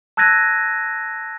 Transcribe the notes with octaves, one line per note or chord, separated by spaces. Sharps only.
A5 E6 F#6 G#6 A#6 D#7